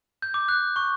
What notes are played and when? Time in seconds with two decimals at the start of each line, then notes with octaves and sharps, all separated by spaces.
0.22 G6
0.34 D6
0.49 F#6
0.76 C#6